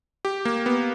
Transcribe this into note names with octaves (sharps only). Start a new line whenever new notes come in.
G4
A#3
B3